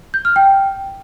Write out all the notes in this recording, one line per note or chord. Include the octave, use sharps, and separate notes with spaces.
G6
F6
G5